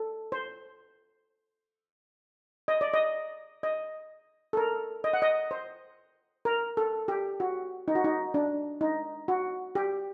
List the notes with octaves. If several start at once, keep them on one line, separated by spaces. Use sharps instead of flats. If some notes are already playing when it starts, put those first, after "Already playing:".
Already playing: A4
C5
D#5
D5
D#5
D#5
A4
A#4
D#5
F#5
D#5
C5
A#4
A4
G4
F#4
D#4
F#4
D#4
D4
D#4
F#4
G4